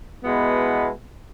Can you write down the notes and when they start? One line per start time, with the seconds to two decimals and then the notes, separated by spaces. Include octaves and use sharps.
0.24 B2 G#3 B3 E4 B4